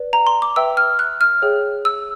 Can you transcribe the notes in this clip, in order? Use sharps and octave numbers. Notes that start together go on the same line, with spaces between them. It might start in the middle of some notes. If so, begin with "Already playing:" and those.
Already playing: B4 D5
A#5
C6
D6
B4 E5 G5 E6
F6
F#6
F6
G#4 C#5 E5 G5
E6